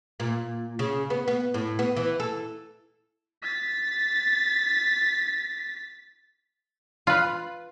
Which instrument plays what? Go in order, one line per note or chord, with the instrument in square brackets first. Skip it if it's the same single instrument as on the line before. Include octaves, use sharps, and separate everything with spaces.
[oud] A#2
C#3
B3
B3
A2
B3
E3
A4
[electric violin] A6 B6
[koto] F4 B4